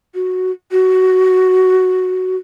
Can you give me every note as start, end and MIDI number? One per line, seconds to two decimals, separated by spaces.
0.15 0.51 66
0.72 2.36 66